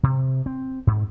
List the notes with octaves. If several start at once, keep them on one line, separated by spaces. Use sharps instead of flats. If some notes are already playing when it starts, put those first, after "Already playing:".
C3
C4
G#2